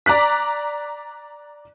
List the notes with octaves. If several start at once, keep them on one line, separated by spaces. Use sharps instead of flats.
D5 A#5 D6 F#6 B6